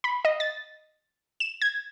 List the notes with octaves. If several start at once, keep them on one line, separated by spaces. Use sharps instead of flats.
B5
D#5
A6
E7
G#6